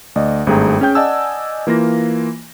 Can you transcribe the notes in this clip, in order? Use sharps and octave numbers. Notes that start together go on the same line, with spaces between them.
D2 D5 D#5
G#1 G2 A3 G#4 G5 A#5
C#4 G#4 G5 G6
D5 D#5 F#5 G#5 A5 E6
E3 A#3 F4 A#6